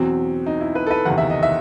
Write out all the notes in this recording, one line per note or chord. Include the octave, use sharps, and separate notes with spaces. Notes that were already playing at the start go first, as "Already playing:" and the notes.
Already playing: E2 B2 F#3 C4
D#4
E4
B4
A4
B4
F#1 E2 C3 D#3 F#5
E5
D#5
E5